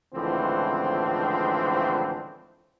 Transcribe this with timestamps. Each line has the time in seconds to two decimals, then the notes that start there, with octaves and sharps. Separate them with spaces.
0.14 C#2 A2 D3 E3 F3 C4